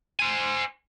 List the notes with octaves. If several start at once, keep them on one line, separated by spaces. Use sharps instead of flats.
C5 G#5